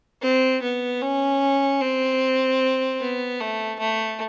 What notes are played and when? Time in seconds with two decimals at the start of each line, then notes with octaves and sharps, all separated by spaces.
0.22 C4
0.62 B3
1.02 C#4
1.81 C4
3.01 B3
3.40 A3
3.79 A3